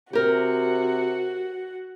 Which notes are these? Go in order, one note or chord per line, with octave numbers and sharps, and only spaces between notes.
C3 F#4 G4 A#4